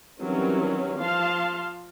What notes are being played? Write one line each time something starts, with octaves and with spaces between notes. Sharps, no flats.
D#3 E3 F#3 G3 C4 C#4
F3 F5 A5 C6